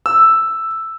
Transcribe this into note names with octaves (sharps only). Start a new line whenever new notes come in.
E6